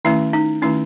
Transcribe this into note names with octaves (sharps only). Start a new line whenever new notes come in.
D#3 A3 C#4 E4
D#4
D#3 A3 C#4 E4